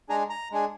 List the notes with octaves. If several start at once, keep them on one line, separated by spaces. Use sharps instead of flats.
G#3 D4 G#4 A#5
A#5
G#3 D4 G#4